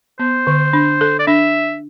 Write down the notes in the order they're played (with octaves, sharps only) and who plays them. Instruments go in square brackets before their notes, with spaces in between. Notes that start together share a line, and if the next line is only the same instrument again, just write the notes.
[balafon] B3 [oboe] C5
[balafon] D3
D4
A4
[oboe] D5
[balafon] D4 [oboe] E5